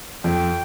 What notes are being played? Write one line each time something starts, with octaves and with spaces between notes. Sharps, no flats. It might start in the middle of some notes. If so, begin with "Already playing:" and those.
F2 G5